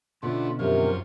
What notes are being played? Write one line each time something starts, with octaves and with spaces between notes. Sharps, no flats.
B2 D3 A3 B3 C#4 D4 F4
F#2 C3 F3 A#4 C#5